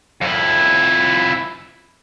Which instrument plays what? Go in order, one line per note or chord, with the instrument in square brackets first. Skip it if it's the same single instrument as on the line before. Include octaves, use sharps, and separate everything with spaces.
[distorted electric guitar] F2 E4